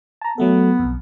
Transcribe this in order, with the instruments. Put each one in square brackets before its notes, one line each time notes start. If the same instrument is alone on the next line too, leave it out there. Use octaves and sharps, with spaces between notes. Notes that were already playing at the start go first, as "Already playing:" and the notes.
[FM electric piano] A5 A#5
[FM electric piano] F#3 A3 A4 [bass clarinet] B3
[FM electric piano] B1 F2